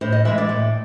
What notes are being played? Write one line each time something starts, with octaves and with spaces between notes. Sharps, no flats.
A2 C5
D#5
E3 G#3 E5
D5
A2